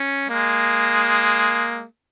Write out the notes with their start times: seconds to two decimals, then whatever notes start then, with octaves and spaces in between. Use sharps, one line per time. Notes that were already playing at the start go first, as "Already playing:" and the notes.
Already playing: C#4
0.29 G#3 A#3